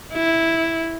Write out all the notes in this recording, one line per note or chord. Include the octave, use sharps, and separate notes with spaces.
E4